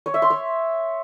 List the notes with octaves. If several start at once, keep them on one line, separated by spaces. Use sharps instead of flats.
C#5
E5
C6
C#5